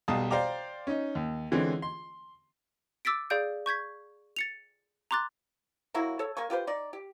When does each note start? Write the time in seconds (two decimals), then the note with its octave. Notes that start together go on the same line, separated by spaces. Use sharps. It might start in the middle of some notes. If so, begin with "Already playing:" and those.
0.08 B1 G3 F5 A5 D#6
0.31 C5 D5 F5 G5 A#5 D6
0.87 C#4 D#4
1.15 D#2
1.52 D3 E3 G#3 C4 C#4
1.82 C6
3.05 D6 E6 A6 B6 D7
3.30 G#4 D5 F5 G6 D7
3.66 C#6 G6 G#6 B6
4.37 A6 C#7 F7
5.11 A#5 C6 D6 F#6 A6
5.94 F#3 A#3 E4 F#4
6.19 A4 C#5
6.37 A#3 G#5 C#6
6.50 F4 G4 B4 C5
6.67 D#4 D5
6.93 G4